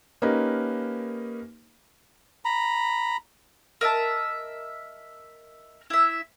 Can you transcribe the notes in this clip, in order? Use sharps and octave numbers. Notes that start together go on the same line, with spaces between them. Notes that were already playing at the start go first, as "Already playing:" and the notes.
A#3 C#4 D#4 G4 A#4 B4
A#5 B5
A#4 D#5 E5 A5
E4 E5